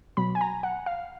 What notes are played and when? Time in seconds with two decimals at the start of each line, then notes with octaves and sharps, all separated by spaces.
0.17 B2 F#3 B5
0.35 G#5
0.41 A#5
0.63 F#5
0.86 F5